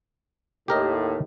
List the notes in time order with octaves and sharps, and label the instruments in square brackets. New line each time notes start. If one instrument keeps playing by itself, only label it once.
[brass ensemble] D#2 A2 [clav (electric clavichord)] G4 A#4 D#5